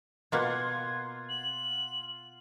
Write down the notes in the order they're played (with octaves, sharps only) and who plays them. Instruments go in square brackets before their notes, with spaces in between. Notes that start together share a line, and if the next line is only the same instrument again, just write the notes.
[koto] B2 A#3 [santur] F4 F#5 C6 [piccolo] G#6
[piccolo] F#7